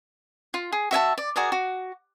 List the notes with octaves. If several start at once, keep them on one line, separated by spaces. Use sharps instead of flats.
F4
G#4
F#4 E5 G#5 A5
D5
F#4 G#4 A#4 D5
F#4